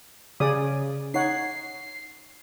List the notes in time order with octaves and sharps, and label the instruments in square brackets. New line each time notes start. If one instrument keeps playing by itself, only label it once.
[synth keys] C#3 [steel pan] G#4 D5 D#6
[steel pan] D#4 C#5 F#5 [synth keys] C7